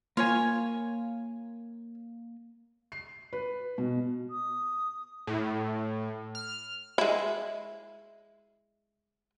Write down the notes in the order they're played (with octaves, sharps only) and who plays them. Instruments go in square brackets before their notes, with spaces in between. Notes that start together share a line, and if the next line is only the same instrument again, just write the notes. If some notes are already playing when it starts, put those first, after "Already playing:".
[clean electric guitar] A#3 G#5 [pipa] F4 C#5
[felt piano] C7
B4
B2
[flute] D#6
[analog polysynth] A2
F6
[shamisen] G#3 E4